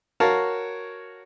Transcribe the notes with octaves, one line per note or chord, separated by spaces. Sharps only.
F#4 A#4 C#5 F5 A5